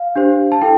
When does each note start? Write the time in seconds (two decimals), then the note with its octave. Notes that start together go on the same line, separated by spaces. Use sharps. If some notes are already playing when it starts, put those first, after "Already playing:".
Already playing: F5
0.16 D4 G4 C5
0.52 A5
0.62 E4 A4 G5